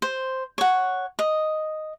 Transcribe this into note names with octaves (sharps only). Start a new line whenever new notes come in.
C5
C#5 F#5
D#5